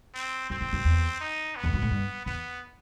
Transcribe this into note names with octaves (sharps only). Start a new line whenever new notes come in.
C4
F#2 C4
F#2
F#2
E2
D#4
B3
E2
F#2
A2
G2
E2 B3